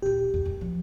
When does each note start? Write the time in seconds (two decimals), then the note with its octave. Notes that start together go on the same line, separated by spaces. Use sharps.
0.02 D#1 D#4 G4
0.34 E2
0.45 F#2
0.61 F3